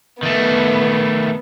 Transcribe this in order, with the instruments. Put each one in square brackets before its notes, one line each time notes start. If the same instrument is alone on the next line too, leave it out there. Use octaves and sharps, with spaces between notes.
[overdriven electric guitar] D#3 A3 [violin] B3